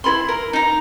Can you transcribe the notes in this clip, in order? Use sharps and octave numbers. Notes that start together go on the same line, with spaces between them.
E4 A4 B5 C6
A#4
D#4 A#5